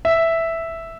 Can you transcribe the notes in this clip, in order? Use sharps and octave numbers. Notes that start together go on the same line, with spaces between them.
E5